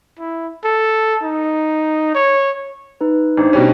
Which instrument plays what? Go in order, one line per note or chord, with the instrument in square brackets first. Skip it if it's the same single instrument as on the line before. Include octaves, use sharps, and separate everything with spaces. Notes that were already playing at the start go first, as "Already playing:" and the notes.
[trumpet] E4
A4
D#4
C#5
[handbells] D#4 B4
[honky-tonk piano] A1 [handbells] D4 D#4 C5
[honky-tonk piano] B2 G3 C#4